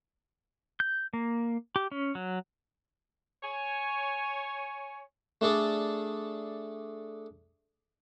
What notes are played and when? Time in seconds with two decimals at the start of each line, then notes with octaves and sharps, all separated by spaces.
0.80 G6
1.13 A#3
1.76 G4
1.91 C#4
2.15 F#3
3.42 C#5 G#5
5.41 A3 D4 G#4 A4 D5